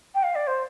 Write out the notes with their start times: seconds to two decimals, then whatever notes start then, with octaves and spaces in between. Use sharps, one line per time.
0.14 G5
0.23 F5
0.35 D5
0.47 C5